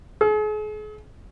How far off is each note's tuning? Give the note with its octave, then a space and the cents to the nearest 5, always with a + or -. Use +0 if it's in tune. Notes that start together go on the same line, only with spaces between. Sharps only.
G#4 +40